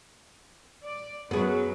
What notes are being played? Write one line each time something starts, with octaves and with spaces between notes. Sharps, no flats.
D5
F#2 F#3 B3 G#4 B4